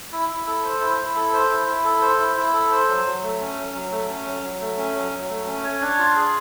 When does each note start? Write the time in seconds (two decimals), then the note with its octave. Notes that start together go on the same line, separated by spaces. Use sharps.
0.12 E4
0.29 E4
0.47 A4
0.64 C5
0.81 E4
0.98 E4
1.16 A4
1.33 C5
1.50 E4
1.67 E4
1.85 A4
2.02 C5
2.19 E4
2.37 E4
2.53 A4
2.71 C5
2.89 F#3
3.05 F#3
3.23 A3
3.40 C#4
3.57 F#3
3.74 F#3
3.92 A3
4.08 C#4
4.26 F#3
4.43 F#3
4.61 A3
4.78 C#4
4.95 F#3
5.12 F#3
5.30 A3
5.47 C#4
5.64 C#5
5.81 D4
5.99 F4
6.15 G#4